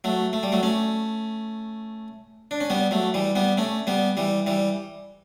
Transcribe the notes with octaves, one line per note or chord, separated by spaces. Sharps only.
F#3 A3
A3
G3
F#3 A3
A3 C#4
D4
C#4
G3 B3
F#3 A3
E3 G3
G3 B3
A3 C#4
G3 B3
E3 G3
E3 G3